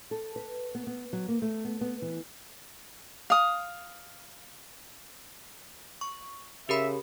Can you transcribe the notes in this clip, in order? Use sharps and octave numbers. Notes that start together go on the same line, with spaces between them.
A4
B4
B3
B3
F#3
A#3
A3
B3
B3
E3
F5 D#6
C#6
C#3 G4 A#4 E5 B5